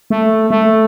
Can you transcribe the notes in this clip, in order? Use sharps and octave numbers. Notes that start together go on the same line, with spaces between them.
A3
A3